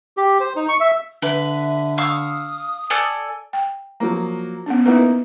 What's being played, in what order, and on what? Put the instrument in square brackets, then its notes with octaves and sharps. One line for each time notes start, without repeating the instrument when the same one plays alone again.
[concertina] G4
C5
D#4
C#6
E5
[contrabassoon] D3 [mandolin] B4 [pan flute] E5
[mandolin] F5 C#6 E6 [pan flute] D#6
[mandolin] A4 D5 G#5
[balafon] G5
[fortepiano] F3 F#3 A#3
[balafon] B3 C#4 D4
[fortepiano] A#3 D#4 E4 [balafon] B3 A#4 B4